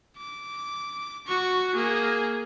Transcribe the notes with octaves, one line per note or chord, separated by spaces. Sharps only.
D6
F#4 C#6
A#3 G#4